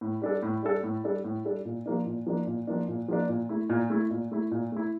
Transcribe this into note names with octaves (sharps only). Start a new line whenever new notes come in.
A2
G3 D4 A4
A2
G3 D4 A4
A2
G3 D4 A4
A2
G3 D4 A4
A#2
F3 A#3 D4
A#2
F3 A#3 D4
A#2
F3 A#3 D4
A#2
F3 A#3 D4
A#2
A3 E4
A#2
A3 E4
A#2
A3 E4
A#2
A3 E4